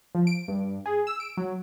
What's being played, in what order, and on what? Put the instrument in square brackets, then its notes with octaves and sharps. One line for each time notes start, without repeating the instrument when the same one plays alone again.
[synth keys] F3
D7
G2
G#4
E6
D7
F#3